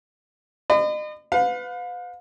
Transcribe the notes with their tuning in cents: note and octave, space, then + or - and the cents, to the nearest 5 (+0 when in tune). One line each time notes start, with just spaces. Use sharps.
D#5 -40 B5 +40
B4 +25 F5 +40